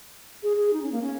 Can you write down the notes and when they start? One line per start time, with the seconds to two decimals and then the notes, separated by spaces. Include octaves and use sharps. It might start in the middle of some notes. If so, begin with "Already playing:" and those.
0.43 G#4
0.57 G#4
0.73 D#4
0.82 C#4
0.92 A#3
1.02 C#4